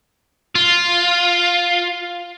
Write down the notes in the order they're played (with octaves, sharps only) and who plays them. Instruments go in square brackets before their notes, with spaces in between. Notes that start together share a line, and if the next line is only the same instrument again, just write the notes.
[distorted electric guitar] F4